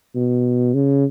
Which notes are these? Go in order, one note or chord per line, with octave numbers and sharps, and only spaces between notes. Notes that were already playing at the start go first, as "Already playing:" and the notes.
B2
C#3